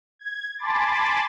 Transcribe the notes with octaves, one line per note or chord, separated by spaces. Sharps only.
G#6
G#5 A5 B5 C6 D6 A6